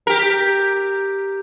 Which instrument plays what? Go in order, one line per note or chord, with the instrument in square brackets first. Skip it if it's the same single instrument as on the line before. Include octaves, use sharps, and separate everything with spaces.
[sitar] G4 A#4